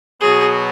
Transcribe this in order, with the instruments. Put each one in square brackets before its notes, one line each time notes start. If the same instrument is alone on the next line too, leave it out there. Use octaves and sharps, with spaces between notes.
[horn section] B2 F#3 B3 [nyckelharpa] G#4